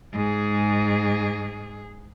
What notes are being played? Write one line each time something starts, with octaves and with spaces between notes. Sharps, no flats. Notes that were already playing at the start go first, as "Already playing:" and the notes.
G#2 G#4